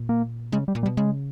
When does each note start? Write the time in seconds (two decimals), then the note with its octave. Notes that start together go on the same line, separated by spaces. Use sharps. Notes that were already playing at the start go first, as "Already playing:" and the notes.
Already playing: A#2
0.09 A#3
0.52 C#3 G#3
0.68 G3
0.75 A#2
0.83 G3
0.86 B2
0.97 C#3 G#3